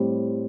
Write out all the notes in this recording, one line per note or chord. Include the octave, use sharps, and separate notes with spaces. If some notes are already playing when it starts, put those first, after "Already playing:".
Already playing: A2 G3 C4